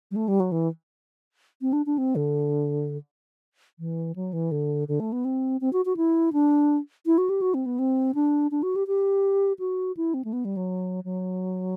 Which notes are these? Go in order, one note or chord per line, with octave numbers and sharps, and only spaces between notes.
G3
A3
G3
F#3
E3
C4
D4
D4
C4
D3
E3
F#3
E3
D3
D3
A3
B3
C4
C4
F#4
F#4
E4
D4
E4
F#4
G4
F#4
C4
B3
C4
D4
D4
F#4
G4
G4
F#4
E4
C4
A3
B3
G3
F#3
F#3